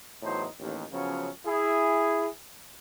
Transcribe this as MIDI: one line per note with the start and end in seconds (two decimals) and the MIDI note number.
0.22 0.45 40
0.22 0.45 45
0.22 0.45 54
0.22 0.45 63
0.22 0.45 72
0.60 0.83 33
0.60 0.83 39
0.92 1.29 49
0.92 1.29 53
0.92 1.29 54
0.92 1.29 59
0.92 1.29 61
1.45 2.27 64
1.45 2.27 68